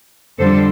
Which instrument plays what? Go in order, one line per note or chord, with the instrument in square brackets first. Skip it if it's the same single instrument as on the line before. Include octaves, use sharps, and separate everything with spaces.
[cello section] F2 D3 G3 D4 A4 C5